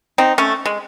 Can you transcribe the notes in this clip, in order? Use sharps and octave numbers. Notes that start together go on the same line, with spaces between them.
C4 D#4
A3 C#4
G#3